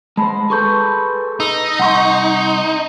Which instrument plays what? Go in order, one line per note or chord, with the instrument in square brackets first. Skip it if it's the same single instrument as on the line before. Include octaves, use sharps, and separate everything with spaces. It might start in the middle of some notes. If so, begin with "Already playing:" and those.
[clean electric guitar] G#3 C5 [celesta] A5 B5
[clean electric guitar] G#4 A4 B4 [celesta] C6 C#6 G6
[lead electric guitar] D#4 [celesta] E6
[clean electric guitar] C2 C6 [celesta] F#5 C#6